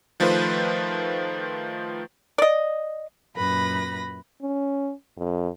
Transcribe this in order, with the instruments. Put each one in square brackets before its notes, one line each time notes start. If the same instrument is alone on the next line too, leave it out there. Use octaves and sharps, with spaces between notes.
[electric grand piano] D#3 F3 A3 F4 B4 C5
[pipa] D5 D#5
[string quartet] F#2 A#2 B4 B5 A#6
[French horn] C#4
F2